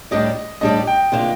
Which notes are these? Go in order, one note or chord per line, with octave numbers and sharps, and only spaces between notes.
A2 G3 D4 G4 D5 D#5
A2 G3 D4 G4 D5 D#5
G5
C3 D#3 A#3 D4 F4